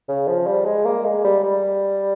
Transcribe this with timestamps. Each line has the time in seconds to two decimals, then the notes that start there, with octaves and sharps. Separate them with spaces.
0.08 C#3
0.27 F3
0.47 G3
0.65 G#3
0.85 A#3
1.05 G#3
1.24 G3
1.44 G3